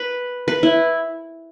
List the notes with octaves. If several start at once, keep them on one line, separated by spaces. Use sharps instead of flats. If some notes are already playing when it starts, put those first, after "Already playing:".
Already playing: B4
B4
E4